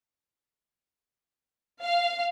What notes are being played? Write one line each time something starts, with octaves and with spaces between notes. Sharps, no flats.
F5